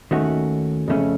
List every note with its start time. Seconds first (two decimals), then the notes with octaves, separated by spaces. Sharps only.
0.11 D#2 D#3 A3 C#4 F#4
0.88 F2 C#3 A3 C#4